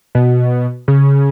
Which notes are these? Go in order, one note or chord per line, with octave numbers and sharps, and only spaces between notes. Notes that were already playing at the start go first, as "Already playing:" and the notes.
B2
C#3